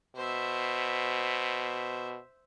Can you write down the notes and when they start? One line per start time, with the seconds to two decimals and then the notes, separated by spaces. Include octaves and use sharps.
0.16 B2 C5 E5